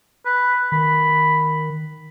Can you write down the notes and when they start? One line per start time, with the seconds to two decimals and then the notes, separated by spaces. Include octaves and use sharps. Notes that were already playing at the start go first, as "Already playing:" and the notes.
0.26 B4
0.72 D#3 B5